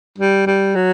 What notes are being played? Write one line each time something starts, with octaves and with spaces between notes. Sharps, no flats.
G3
G3
F#3